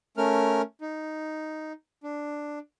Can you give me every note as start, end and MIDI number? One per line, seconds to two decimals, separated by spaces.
0.17 0.62 57
0.17 0.62 61
0.17 0.62 70
0.17 0.62 89
0.81 1.73 63
2.03 2.59 62